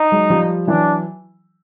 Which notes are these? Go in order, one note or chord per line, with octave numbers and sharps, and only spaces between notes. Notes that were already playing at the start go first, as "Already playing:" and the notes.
Already playing: D#4
F#3 G#3
F3 G3
E3 F#3 D4